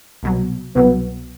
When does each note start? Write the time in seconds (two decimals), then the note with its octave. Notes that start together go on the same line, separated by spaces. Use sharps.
0.23 C2 B2 F#3
0.75 C2 B2 F#3 B3